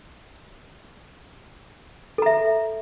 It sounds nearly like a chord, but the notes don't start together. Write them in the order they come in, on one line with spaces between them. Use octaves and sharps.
A4 A#5 E5